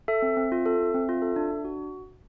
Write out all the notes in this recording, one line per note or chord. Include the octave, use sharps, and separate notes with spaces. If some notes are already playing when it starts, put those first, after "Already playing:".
A4 E5
C4
C4
F4
A4
C4
C4
F4
A4
D4
D4
F#4